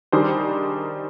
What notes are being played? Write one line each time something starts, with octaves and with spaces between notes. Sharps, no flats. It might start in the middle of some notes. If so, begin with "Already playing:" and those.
D#3 G3 D4 G#4 C5